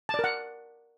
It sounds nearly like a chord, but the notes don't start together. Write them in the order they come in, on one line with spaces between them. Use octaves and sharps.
A5 D5 A#4 F#5